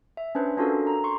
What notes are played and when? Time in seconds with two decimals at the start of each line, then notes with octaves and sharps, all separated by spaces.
0.17 E5
0.35 C#4 D4 B4 C5
0.57 C#4 D4 F4 F#4 A4 A#4
0.87 A#5
1.04 C6 C#6